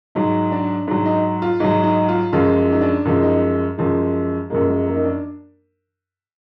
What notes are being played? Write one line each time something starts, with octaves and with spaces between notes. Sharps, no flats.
G#2 F#3 D#4
D4
G#2 F#3 D4
D#4
F4
G#2 F#3 D#4
D#4
F4
F#2 F3 G#3 F4
D#4
D4
F#2 F3 G#3
D#4
F#2 F3 G#3
F#2 F3 G#3 A#3
G#3
A#3
D#4
D4